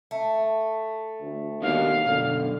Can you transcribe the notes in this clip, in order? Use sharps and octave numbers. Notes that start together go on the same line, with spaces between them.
A3
D2
D#2 B3 D4 F#4 F5
F#2 B2 D3